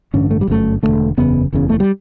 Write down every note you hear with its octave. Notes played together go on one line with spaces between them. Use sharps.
A1 G2 D3 C#4
A3
G3
G1 F#2 C#3 A3
E1 E2 D3 A3
F#1 E2 C#3 B3
F#1 E2 C#3
A3
G3